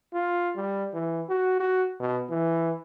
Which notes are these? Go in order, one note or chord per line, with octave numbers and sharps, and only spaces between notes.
F4
G3
E3
F#4
F#4
B2
E3